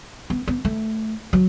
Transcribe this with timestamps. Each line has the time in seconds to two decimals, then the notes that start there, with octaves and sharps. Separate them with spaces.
0.30 B3
0.48 B3
0.65 A3
1.33 F#3